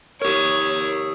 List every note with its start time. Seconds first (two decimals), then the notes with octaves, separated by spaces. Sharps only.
0.22 G4 A#4 C#5